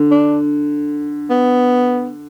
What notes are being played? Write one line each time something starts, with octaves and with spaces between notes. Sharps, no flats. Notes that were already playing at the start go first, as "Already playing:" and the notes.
Already playing: D3
D4
B3